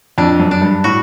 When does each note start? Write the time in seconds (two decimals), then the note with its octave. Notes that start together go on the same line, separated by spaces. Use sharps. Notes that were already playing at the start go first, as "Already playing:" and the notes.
0.18 F2 D4
0.40 F#2
0.51 D4
0.61 G2
0.84 A2 F#4